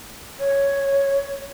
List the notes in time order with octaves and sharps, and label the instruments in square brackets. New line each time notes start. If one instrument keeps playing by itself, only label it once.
[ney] C#5